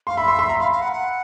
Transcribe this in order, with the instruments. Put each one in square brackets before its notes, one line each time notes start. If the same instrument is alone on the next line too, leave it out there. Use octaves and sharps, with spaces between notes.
[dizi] F5 [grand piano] C6
[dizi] E5 [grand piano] B5
[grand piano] C6
C6
A#5
[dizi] F5 [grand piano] B5
[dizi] F5
F#5
F#5